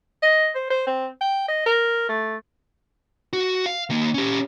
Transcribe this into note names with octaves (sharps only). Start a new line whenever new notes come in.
D#5
C5
C5
C4
G5
D#5
A#4
A3
F#4
F5
D#3 A#3
C#4 G4